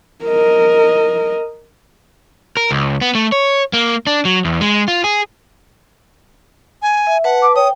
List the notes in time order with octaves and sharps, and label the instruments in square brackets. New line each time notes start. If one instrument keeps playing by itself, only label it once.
[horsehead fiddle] A#4 D#5
[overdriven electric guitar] A#4
C#2
B3
A3
C#5
A#3
D4
F#3
E2
G#3
F4
G#4
[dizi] G#5
[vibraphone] E5
[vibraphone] B4 A5 [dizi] F#5
[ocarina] D6
[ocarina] C#5 [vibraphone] G5 [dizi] D#6